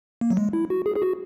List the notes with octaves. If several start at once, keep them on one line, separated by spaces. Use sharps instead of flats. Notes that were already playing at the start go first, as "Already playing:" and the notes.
A#3
F#3
G#3
E4
F#4
G#4
G#4
F#4